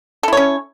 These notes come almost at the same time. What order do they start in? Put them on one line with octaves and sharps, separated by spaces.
A4 E4 C#5 C#4